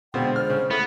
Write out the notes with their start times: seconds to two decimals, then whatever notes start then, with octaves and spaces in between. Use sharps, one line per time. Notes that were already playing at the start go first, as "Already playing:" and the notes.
0.14 B2 D3 G#3 C4 F4 G5
0.36 C5 F6
0.50 C#3
0.71 A3 B3 E4 A4 A#6